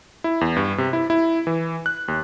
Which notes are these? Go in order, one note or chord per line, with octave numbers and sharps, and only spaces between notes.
E4
E2
G2
C3
E4
E4
E3
F#6
D#2